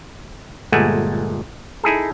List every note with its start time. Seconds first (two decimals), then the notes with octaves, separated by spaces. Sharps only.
0.72 G1 A#2 G#3 A3 F#5 G#5
1.84 D#4 E4 G#4 A4